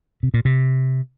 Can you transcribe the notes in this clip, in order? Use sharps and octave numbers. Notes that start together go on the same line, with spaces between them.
C3
A#2
C3